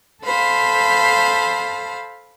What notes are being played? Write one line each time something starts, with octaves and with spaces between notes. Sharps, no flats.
A4 C5 F5 B5